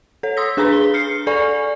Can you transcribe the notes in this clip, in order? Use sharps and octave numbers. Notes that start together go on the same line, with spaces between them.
A4 C#5
C6 D#6 E6 A#6 B6
D4 G#4 B4 A#5 B5 B6
G7
F6 G6 C7 C#7
A4 D5 G#5 C#6